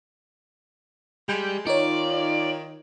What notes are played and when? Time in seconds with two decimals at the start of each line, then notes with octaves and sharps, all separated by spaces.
1.29 G3 G#3 G6
1.67 D#3 D#4 F4 C#5 D5